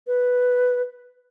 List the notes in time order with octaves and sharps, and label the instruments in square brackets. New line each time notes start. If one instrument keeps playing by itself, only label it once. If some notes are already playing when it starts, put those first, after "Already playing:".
[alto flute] B4